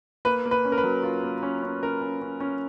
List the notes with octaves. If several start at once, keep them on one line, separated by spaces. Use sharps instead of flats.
A#3 B4
A#3
B4
C#4
A#4
B4
F#3
F4
A#3
C#4
C#4
C#4 A#4
C#4
C#4
C#4